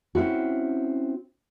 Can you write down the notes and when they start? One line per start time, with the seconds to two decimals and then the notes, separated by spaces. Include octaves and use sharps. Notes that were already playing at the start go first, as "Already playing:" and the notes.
0.15 C4 C#4 E4 F#4